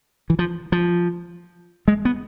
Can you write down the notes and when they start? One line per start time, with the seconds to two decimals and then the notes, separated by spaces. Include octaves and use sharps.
0.30 E3
0.39 F3
0.72 F3
1.88 G#3
2.05 B3